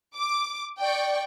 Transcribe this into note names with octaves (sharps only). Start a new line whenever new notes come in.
D6
D5 G5 C#6